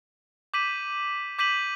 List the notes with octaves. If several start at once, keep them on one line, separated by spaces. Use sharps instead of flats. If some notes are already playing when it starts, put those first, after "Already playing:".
D6 G6 B6 D#7 F#7
D6 G6 B6 D#7 F#7